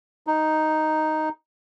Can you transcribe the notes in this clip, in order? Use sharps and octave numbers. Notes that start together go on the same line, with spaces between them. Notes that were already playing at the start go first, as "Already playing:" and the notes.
D#4